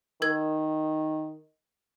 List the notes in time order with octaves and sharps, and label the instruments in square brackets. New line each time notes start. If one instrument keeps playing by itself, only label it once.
[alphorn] D#3 [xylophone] A#4 G#6